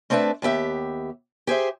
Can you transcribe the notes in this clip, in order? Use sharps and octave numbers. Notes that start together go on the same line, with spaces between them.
A3 C4 D4 B4 E5 A5
D#2 B3 G4 E5
G4 G#4 C5 E5